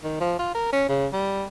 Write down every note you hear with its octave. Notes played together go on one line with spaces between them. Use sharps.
D#3
F3
F4
A#4
C#4
C#3
G3